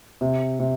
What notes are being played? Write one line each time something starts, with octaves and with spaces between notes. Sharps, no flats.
C3
C3